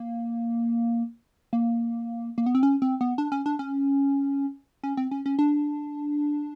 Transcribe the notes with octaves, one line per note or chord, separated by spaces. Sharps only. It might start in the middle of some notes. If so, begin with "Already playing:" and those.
Already playing: A#3
A#3
A#3
B3
C4
C#4
C4
B3
D4
C#4
D4
C#4
C#4
C4
C#4
C#4
D4